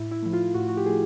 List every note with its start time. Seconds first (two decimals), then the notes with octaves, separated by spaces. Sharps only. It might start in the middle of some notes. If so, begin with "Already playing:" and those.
Already playing: A2 E4
0.11 E4
0.22 F3 A3 E4
0.33 F4
0.54 A2 F#4
0.69 F#4
0.77 G4
0.86 F3 A3 G#4